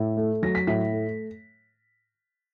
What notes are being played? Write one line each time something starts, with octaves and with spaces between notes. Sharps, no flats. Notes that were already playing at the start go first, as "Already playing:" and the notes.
Already playing: A2
A3
F#3 A#6
B6
A2 B6
A3